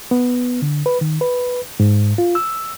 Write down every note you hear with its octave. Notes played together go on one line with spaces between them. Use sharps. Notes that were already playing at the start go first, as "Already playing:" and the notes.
B3
D3
B4
D#3
B4
G#2
F4
E6